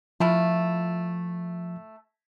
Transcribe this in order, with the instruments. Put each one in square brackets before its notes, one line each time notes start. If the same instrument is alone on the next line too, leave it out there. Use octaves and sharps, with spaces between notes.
[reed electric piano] F3 [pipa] A3 E4 F4